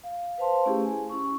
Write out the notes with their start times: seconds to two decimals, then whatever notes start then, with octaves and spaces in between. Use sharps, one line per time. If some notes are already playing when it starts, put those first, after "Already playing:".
0.04 F5
0.38 B4 C5 F5 A5 C6
0.66 A3 C#4 E4 G4 G#4
0.85 G#5
1.10 C#4 E4 C#6